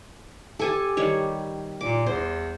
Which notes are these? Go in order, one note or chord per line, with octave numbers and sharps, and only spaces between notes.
G4 A4 G#5 A5
D#3 G3 C#5
A#2 D6
E2 C5